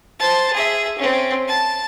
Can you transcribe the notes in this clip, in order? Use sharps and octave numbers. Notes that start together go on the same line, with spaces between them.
C5 A5
G#4 E5
C4 C#4
A5